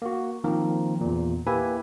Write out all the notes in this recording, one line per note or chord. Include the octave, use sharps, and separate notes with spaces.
A#3 F#4
D#3 F3 A#3 C4 A#4
E2 A#2
A#3 E4 G4 B4 E5 G#5